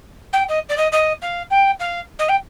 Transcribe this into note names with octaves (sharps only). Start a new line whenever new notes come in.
G5
D#5
D5
D#5
D#5
F5
G5
F5
D#5
G5